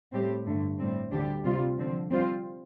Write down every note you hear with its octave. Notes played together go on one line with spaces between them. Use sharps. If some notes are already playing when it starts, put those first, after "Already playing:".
A2 G3 C4 G4
G2 D3 A3
A2 G3 C4
D2 D3 G3 D4 G4
C3 G3 C4 F4
D3 F3 C4
G3 C4 F4 C5